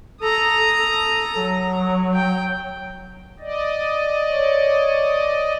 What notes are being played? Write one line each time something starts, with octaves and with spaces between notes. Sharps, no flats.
A4 A#5 D#6
A4
F#3
G5
D5 D#5
C#5